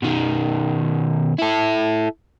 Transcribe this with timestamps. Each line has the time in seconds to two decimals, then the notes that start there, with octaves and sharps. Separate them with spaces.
0.02 B2 D#3
1.38 E4 A4